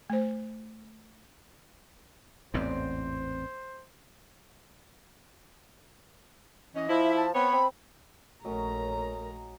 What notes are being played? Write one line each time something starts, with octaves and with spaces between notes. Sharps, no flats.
A3 C5
A1 E2 G#2 B3 C4 C5 D5
E3 C#4 D#5
F3 E4
E5
A5
B3 C4 C#5 B5
C4
A#1 F#3 A3 C#4 A#4 D#5 A#5